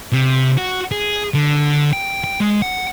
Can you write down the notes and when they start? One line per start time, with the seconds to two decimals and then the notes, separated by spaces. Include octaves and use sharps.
0.12 C3
0.57 F#4
0.92 G#4
1.34 D3
1.93 G5
2.24 G5
2.40 G#3
2.62 F#5